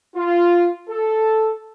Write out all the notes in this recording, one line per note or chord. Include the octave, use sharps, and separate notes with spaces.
F4
A4